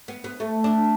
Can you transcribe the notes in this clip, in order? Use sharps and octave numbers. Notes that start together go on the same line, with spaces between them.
B3
B3
A3
D4